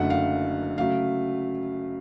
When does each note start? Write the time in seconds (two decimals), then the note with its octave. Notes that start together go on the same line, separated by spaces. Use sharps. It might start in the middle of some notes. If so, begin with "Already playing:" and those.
Already playing: F#1 F#2 D3 F#3 A3 F#5
0.10 F5
0.78 C#3 F#3 A3 F5